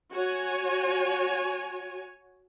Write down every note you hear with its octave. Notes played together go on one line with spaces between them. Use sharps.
F#4 C#5 G#5